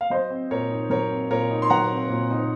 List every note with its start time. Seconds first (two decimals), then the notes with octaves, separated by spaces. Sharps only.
0.01 F5
0.10 F#3 C5 D#5
0.30 C4
0.51 A#2 A#4 C#5
0.70 D#4
0.90 F#3 A#4 C#5
1.10 C4
1.30 A#2 A#4 C#5
1.51 D#4
1.62 C6
1.70 F#3 F#5 A#5
1.91 C4
2.09 A#2
2.30 D#4